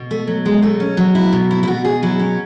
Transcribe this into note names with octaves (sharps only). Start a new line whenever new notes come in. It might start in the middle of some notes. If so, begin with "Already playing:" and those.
Already playing: B2
A3
F#3
G#3
B2 A3
C#4
F#3
E4
B2
E4
E4
B2 F#4
G#4
F#3 E4
C#4